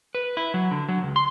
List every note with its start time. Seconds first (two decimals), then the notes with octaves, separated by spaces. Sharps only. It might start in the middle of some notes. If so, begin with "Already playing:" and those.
0.15 B4
0.37 E4
0.54 F#3
0.71 D3
0.89 F#3
1.03 C#2
1.16 C6